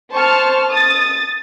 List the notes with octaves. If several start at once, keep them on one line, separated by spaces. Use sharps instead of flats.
C5 A5 C#6 F6
D#6 A6